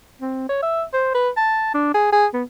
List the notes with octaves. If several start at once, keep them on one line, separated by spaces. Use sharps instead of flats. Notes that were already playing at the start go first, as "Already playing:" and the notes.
C4
C#5
E5
C5
B4
A5
D4
G#4
G#4
B3